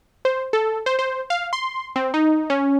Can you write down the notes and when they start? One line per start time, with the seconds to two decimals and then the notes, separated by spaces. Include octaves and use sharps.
0.25 C5
0.53 A4
0.86 C5
0.99 C5
1.30 F5
1.53 C6
1.96 C4
2.14 D#4
2.50 C#4